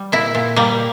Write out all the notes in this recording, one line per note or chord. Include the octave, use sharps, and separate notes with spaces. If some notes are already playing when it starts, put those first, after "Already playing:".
Already playing: G3
A#2 E4
A#2
G3 A#3